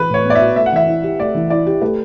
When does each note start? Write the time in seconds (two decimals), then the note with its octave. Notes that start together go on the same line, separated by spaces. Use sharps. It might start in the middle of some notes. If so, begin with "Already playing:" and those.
Already playing: E3 B4
0.10 A2 C#5
0.25 B3
0.30 D5
0.35 E5
0.40 F#4
0.56 A3 E5
0.66 F#5
0.73 E3 E5
0.87 E4
1.04 G4
1.20 A3 D5
1.35 E3
1.50 E4 D5
1.67 G4
1.82 A3 B4